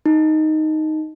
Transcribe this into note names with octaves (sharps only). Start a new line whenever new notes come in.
D#4